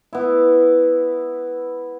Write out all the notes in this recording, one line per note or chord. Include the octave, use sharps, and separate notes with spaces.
B3 E4